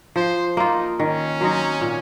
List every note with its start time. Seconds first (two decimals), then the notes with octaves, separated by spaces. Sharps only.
0.16 F3 C5
0.57 A#3 D#4 F4
1.00 D#3 C#4
1.41 F#3 C4 D#4
1.81 A#2